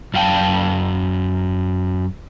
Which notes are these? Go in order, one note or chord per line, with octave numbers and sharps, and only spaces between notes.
F#2 F5 G5 A5